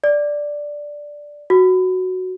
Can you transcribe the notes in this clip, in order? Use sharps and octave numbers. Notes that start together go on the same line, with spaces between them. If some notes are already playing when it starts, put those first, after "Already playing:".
D5
F#4